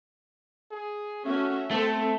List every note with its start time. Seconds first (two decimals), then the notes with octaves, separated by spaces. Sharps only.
0.71 G#4
1.26 A3 C#4 F#4 E5
1.71 A3 C4 A4